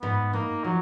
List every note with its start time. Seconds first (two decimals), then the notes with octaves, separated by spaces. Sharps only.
0.02 G#2 B3
0.33 A#3 D#4
0.64 F3 F#3